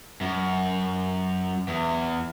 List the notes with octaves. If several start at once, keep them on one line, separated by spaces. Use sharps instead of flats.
F#2
E2